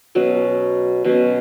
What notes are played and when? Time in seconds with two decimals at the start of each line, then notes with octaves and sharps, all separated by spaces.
0.15 B2 F#3 C#4
1.04 B2 F#3 C#4